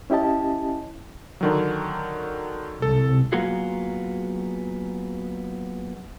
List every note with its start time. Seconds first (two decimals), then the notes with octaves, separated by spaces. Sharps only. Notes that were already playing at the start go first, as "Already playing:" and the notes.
0.10 C#4 E4 G4 D#5 A5
1.41 D3 D#3 F#3
2.82 C2 A4
3.33 F#3 A#3 B3 F4 F#4 G#4